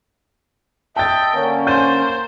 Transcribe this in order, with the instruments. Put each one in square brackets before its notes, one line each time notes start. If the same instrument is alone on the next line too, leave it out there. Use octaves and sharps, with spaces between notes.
[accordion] D#5 E5 [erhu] G5 [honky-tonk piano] A5 A6
[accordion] D3 C#4 [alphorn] A#3
[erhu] C5 [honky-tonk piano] G6 A6 D#7